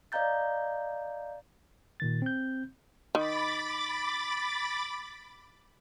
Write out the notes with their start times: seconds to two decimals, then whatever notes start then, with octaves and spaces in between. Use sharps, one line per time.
0.12 D5 D#5 F5 A#5 G6 A6
2.00 A#2 D#3 A6
2.22 C4 G6
3.15 D#3 B5 D6 A6